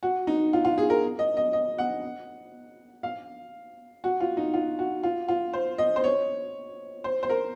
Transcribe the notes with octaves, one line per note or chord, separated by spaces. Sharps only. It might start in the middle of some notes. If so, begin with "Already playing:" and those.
F#4
D#4
F4
F4
G#4
A#4
D#5
D#5
D#5
F#5
F5
F#4
F4
D#4
F4
F#4
F4
F4
C5
D#5
C5
C#5
C5
C5
A#4